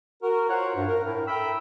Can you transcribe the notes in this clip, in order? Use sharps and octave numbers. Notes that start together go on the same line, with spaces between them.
F#4 A#4
F4 A#4 C5 C#5 F#5
G2
A#4
A2
A4 A#4 E5 G5 B5 E6